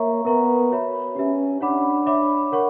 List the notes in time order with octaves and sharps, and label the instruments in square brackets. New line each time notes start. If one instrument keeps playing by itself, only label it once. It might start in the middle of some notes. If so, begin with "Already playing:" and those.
Already playing: [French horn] A#3 [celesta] C#5 E5 A#5 C#6
[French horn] B3 [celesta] A#4 E5 A#5 C#6
[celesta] F#4 C#5 E5 B5
[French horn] C#4 [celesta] G4 B4 E5
[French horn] D4 [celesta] C#5 F#5 B5 D6
[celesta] C#5 E5 B5 D6
A#4 C#5 F#5 C#6